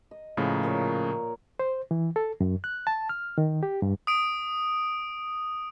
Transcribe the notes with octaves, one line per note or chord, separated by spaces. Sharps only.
D#5
A2 C#3 F3 A#3
A#2 A#4 C#5
C5
E3
A4
F#2
F#6
A5
F6
D#3
G4
G2
D#6 D7